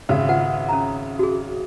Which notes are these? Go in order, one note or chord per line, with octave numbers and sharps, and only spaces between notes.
G#1 C#3 E5 F5
F4 B4 F#5
C#4 A#5
F#4 G#4